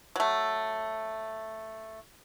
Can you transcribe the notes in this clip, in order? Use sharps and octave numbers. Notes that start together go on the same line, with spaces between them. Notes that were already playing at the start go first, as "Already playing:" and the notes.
F#3 A3